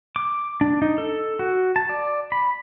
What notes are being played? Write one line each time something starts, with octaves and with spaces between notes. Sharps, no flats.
D6
D4
D#4
A4
F#4
A5
D5
B5